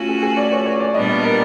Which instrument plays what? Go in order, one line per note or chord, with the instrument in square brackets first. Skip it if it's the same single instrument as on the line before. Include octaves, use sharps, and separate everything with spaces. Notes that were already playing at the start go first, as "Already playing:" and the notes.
Already playing: [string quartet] A3 C#4 F#4 [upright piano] F4
[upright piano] G#4
G#4
D5
C#5
C#5
D5
[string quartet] A#2 G3 B3 D4 G4 [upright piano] D#5
[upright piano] D#5
A#4